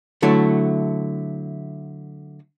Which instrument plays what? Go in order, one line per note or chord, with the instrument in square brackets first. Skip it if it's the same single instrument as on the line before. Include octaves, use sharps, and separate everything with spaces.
[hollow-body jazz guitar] D3 F#3 A3 E4